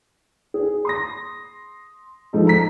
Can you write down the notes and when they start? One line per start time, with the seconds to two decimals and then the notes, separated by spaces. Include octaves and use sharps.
0.54 G#4
0.85 C6 D#6 A#6
2.33 F3 G#3 D#4 A4
2.47 A#5 B6